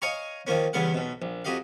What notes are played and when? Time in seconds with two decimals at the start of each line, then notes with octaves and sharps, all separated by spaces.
0.02 C#5 D#5 F5 G#5 A#5 C#6
0.47 D#3 F3 A#3 C#4
0.73 E2 G2 C#3 B3 F5 F#5
0.94 B1 B2
1.22 A#1
1.45 F2 F#4 G4 D#5 F5